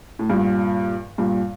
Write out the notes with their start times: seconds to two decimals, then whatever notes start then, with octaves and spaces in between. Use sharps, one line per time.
0.19 A2
0.30 G2 A#2
1.18 G2 A#2